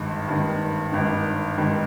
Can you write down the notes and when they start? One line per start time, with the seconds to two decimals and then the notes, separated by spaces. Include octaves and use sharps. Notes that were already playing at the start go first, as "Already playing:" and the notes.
Already playing: G#1 G2 D#3
0.26 G#1 G2 D#3
0.92 G#1 G2 D#3
1.57 G#1 G2 D#3